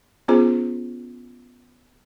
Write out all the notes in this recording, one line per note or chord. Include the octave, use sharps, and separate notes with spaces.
B3 C#4 F4 G#4 C5